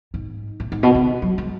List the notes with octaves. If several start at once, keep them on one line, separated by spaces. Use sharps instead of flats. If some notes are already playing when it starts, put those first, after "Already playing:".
G#2
A2
G#2
B2
C#3
F#3
G#3